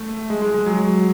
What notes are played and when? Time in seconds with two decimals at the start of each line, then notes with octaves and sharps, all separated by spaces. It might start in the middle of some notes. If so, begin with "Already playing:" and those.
Already playing: A3
0.30 G#3
0.42 G#3
0.54 G#3
0.66 F#3